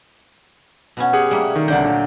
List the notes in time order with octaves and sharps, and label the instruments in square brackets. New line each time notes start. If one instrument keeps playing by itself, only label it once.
[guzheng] B2 B3 C#4
[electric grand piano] G4 G#4 F#5
[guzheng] G3 A3 A#3
[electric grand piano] D#3
[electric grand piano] C2 D5 G6 [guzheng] D3 F#3
[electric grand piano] A#2